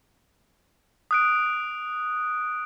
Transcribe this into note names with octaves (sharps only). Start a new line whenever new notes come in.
D#6 F#6 D7